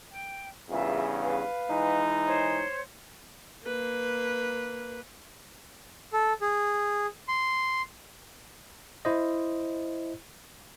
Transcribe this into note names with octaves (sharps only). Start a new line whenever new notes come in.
G5
E2 G2 C#3 F4 A#4 E5
B4 F5
E3 G#3 D#4
C5 C#5 C6
A#3 B4
A4
G#4
C6
E4 C5 D#5